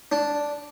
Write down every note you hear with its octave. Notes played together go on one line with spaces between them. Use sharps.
D4